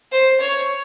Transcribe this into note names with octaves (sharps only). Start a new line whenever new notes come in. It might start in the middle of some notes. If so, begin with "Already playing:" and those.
C5
C#5